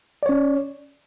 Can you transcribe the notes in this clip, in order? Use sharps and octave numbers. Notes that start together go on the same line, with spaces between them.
C#4 C#5 D5